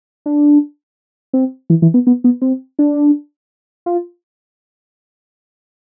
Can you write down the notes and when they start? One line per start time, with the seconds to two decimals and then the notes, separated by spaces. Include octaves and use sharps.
0.26 D4
1.33 C4
1.70 E3
1.82 E3
1.94 B3
2.07 B3
2.24 B3
2.42 C4
2.79 D4
3.86 F4